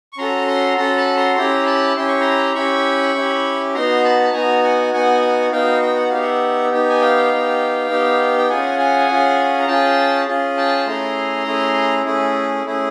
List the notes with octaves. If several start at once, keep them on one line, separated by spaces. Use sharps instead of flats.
C#6
C#4 F#4 A4 A#5 C6
A#5 C6
C#4 F#4 A4 A#5 C6
A5 B5
A#5 C6
C#4 E4 G4 A#5 C6
A5 B5
C#4 E4 G4 C6
C#6
A#5 C6
C#4 E4 G4 B5 C#6
C#4 E4 G4
B3 D#4 F#4 A#5 C6
A5 B5
A5
B3 D#4 F#4 G#5 A#5
F#5 G#5
B3 D#4 F#4 F#5 G#5
B3 D#4 F#4 F5 G5
G5
F#5
B3 D#4 G4 F5
E5 F#5
B3 D#4 G4
G#5
F5 G5
B3 D#4 G4
B3 D#4 G4
G5
C#4 F4 G#4 F#5 G#5
F#5 G#5
C#4 F4 G#4
A#5
C#4 F4 G#4 G5 A5
C#4 F4 G#4
G5 A5
A3 C#4 E4 G#4 A#5 C6
A3 C#4 E4 G#4
A3 C#4 E4 G#4
A3 C#4 E4 G#4